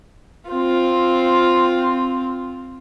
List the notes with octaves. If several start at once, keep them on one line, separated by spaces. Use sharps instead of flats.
C4 F4